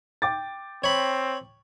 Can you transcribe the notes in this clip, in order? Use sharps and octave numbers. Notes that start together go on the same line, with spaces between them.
G5 D6 A6
C4 C#5 B5